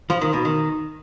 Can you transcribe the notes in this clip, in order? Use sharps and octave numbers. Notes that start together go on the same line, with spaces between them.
F3
D#3
B2
D#3